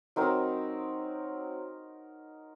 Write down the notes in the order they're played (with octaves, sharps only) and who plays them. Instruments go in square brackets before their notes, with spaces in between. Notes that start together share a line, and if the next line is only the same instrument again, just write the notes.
[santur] F#3 C4 D#4 A#4